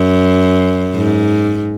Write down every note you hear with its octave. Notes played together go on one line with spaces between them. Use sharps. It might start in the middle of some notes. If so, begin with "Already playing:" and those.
Already playing: F#2
G#2